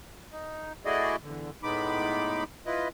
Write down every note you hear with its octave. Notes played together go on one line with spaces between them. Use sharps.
D#4
A3 E4 F#4 G#4 D5 D#5
E2 D3
A2 G#3 B3 D#4 B5 D6
E4 F4 B4 D#5